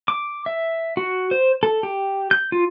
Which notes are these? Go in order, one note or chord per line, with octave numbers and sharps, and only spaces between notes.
D6
E5
F#4
C5
A4
G4
G6
F4